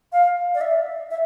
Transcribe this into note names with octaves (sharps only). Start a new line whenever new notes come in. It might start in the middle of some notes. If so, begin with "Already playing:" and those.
F5
D5
E5
E5